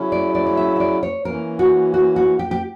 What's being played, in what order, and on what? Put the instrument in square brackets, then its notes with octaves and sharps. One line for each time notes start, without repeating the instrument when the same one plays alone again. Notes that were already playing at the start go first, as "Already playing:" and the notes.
Already playing: [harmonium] C#3 F#3 C#4 E4
[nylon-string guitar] D5
D5
D5
E5
E5
D5
C#5
[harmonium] E3 A#3 C#4 [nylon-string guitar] A#4
[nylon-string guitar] F#4
F#4
F#4
G4
G4